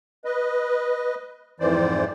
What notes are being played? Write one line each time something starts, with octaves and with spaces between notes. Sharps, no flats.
B4 D#5
F2 G#2 E3 C5 D5